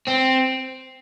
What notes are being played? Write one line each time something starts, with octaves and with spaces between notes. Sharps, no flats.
C4